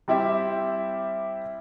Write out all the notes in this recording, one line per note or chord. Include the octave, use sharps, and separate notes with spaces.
G3 C4 E4 G4 E5